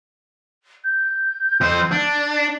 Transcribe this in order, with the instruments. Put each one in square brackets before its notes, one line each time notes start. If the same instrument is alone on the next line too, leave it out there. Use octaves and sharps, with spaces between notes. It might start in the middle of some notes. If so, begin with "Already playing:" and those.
[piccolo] G6
[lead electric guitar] F2 C5
D4